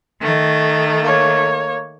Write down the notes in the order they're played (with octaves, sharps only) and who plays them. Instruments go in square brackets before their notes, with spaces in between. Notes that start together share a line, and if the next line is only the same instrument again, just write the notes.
[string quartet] D#3 A3
[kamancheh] A#3 C#5